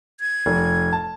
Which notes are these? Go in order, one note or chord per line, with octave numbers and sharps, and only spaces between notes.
G#6
F1
A5